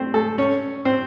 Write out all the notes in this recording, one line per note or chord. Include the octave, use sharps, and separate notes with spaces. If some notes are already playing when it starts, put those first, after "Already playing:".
Already playing: A3 C4 C5
A3 A4
C#4 C#5
C4 C5